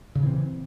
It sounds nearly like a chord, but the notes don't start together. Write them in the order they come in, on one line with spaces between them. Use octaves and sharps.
C#3 A#2 E3 C4